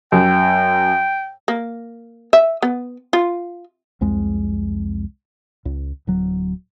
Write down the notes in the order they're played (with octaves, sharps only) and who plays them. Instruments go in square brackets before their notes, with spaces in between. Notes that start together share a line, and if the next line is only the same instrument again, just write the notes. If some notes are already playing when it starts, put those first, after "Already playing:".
[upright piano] F#2 [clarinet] G5
[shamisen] A#3
E5
B3
F4
[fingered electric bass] C2 F2 G#3
C#2
D1 F#3